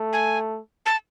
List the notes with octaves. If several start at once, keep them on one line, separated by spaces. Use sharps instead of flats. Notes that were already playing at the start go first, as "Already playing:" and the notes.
Already playing: A3
G#5
A5